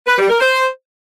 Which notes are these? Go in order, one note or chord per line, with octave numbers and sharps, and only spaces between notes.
B4
G3
A#4
C5